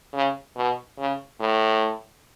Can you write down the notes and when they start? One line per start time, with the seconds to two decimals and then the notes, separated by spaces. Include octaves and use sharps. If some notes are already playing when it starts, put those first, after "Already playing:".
0.14 C#3
0.56 B2
0.98 C#3
1.40 A2